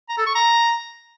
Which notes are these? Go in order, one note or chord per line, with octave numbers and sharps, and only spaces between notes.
A#5
A4
C#6
A#5